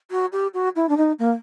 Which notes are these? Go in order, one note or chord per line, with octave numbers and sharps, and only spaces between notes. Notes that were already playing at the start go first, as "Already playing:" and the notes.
F#4
G4
F#4
E4
D4
D#4
A#3